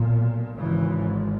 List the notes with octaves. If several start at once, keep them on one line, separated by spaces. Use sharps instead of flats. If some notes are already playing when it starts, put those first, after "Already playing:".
Already playing: B1 A#2
G#1 G#2 C#3 E3